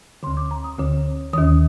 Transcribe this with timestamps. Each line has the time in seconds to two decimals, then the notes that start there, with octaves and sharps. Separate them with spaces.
0.23 D3 C6
0.27 D2
0.37 D6
0.51 A#5
0.64 D#6
0.78 D2 D3
1.33 D#2 D#3 D#6